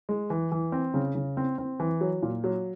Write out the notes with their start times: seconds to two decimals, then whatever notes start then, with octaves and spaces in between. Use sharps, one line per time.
0.09 G#3
0.30 E3
0.52 E3
0.72 C4
0.94 C#3
1.15 C#3
1.37 C4
1.58 C4
1.80 E3
2.01 F#3
2.23 A#2
2.44 F#3